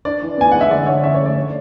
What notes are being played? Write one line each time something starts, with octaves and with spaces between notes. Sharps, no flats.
D4 D5
E3
B3 G#5
G#3 F#5
E5
D3 D5
D3 C#5
C#4 C#5 E5
C#5
A3
D5
D4 C#5